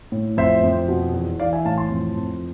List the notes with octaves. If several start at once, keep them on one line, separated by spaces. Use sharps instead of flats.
A2
F2 C5 E5
F2
B2
E2
E3 D5 F5
E5 G#5
A2 F5 A5
A5 C6
F2
F2